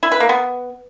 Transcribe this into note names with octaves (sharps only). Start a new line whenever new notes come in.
E4
B4
A#3
B3